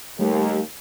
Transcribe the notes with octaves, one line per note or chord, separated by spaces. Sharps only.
D#2 G3 A3 G4